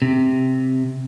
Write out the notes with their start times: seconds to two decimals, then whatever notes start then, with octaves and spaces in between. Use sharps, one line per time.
0.02 C3